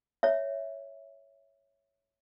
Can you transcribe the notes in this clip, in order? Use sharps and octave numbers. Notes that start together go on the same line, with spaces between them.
C#5 E5